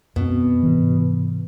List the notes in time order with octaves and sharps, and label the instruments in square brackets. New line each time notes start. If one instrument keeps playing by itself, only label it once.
[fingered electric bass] F#2 C4 [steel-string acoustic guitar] B2
[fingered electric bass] G#2 C3 E3